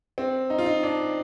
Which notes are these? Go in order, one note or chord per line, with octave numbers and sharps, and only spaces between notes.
C4
D#4
F4
D#4
D4